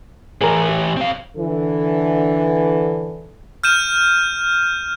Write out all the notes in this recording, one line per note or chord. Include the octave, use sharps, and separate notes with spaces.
A2 E3 G#4 A#4
G4
C4 F5
D3 E3 A4
F6 G6 D#7 E7